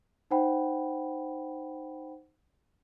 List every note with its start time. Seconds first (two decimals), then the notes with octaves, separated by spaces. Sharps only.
0.31 D#4 C5 F#5 G5 B5